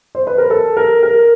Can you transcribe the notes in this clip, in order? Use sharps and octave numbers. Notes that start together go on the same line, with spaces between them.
C5
B4
A#4
A4
A#4
A#4